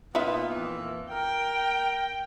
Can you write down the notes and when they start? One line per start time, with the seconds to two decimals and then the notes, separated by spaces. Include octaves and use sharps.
0.15 A#2 B3 D#4 F4 B4 E5
0.51 F2 A#2 E3
1.12 A#4 G5